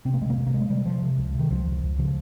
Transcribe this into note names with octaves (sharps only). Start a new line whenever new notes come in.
C3 C4
A#3
C3 G#3
A#3
C3
A#3
C3 G#3
C3 G3
C3 F3
C3
C#2
C3 D#3
C#2 F3
C#2
C#2
C#3 F3